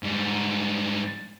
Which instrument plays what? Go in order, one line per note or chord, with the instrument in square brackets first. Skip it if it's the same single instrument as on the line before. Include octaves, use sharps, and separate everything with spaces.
[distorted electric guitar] G#2 G3